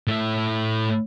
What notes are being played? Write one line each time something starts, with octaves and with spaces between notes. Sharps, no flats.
A2 E5